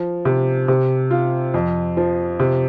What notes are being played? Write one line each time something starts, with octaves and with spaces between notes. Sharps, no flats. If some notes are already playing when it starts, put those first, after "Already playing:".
Already playing: F3
C3
C3
F4
F2
F3
C3